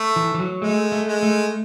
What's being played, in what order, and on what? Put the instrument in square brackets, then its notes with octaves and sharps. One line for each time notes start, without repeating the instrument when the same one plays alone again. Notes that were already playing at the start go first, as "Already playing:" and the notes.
Already playing: [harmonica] A3
[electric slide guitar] E3
E3
F#3
[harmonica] G#3 [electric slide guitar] A3
[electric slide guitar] A3
[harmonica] G#3
[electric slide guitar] A3